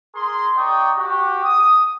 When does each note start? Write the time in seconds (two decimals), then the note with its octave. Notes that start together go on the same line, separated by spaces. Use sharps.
0.15 G#4 A#4 C6
0.57 D#4 D5 G5 C#6 D#6
0.97 F#4 G4
1.43 D#6